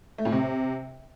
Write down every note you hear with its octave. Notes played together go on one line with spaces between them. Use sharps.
A3
A2
C3